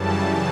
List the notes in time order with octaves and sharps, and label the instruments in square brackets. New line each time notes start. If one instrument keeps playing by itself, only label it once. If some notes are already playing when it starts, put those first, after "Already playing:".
Already playing: [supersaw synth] F#2 C#3 E3 G3 A5